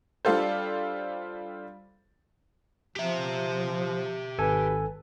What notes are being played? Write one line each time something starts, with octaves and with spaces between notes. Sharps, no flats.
G3 D4 F4 A4 C5
F3 G4 E5
G#1 A4 B4 G#5